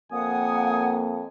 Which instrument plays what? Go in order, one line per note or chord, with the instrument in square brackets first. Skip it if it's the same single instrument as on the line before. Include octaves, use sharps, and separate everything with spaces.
[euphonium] F2 [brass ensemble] A#3 [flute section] F#5 D#6 [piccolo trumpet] G#5